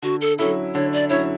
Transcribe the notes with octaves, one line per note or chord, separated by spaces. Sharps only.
D3 F#4
A4
F#3 C#4 E4 A4
D3 C#5
D5
F#3 C#4 E4 C#5